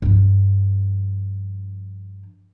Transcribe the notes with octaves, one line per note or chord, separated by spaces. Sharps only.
G2 F3